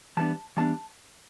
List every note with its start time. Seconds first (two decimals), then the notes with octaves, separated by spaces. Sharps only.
0.17 E3 G3 B3 D4 A5
0.57 E3 G3 B3 D4 A5